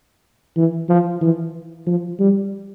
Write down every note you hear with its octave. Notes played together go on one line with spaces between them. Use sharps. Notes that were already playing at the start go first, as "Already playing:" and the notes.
E3
F3
E3
F3
G3